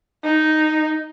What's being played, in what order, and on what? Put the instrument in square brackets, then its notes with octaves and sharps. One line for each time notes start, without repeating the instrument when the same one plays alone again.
[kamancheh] D#4